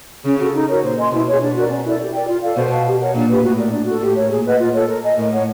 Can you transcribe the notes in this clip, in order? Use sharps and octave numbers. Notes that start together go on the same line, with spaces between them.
C#3 C#4
F#4 A4
D#4
F#4 A#4 C#5
A#2 C5
D#5 G#5 C6
B2 E4
G#4 C#5
B2 D4
F#4 A#4 D5
C#4
E4 A4 D5
G4
A#4 D5 G5
F4
A4 D5 F5
B2 C5
F5 A5
G4
A#4 C#5 F#5
A#2 D4
G4 B4
A2 F#4
A#4 D5
D4
F#4 A4
A2 G4
A#4 C#5
A#2 G#4
B4 D#5 F#5
A#2 F4
A4 C#5
A#4
D#5 G#5
A2 A#4
C#5 F#5